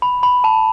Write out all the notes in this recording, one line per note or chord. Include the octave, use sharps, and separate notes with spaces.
B5
B5
A5